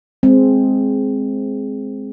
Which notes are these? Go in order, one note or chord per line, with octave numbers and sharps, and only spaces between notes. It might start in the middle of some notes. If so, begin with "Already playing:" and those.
G#3 C4